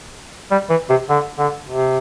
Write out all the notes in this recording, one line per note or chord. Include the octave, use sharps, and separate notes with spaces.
G3
E3
C3
D3
D3
C3